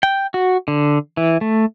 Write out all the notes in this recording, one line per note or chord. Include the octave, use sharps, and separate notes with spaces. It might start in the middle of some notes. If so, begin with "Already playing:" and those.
G5
F#4
D3
E3
A3